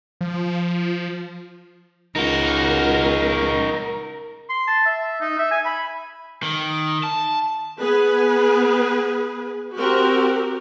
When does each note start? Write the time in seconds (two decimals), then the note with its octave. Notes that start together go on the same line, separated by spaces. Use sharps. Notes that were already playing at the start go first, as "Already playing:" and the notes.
0.21 F3
2.16 C#2 D#4 F#4 A#4
4.49 C6
4.67 A5
4.85 E5
5.21 D#4
5.38 E5
5.51 G#5
5.65 B5
6.43 D#3
7.04 A5
7.81 B3 G#4 B4
9.77 C4 F#4 G4 A#4